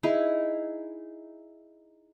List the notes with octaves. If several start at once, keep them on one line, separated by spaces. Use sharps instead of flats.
D#4 E4 G#4